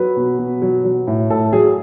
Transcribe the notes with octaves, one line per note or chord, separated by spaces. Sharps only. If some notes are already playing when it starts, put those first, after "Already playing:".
Already playing: F#3 B4
B2
B2
F#3
F#3
A2
A2 A4
F#3 G#4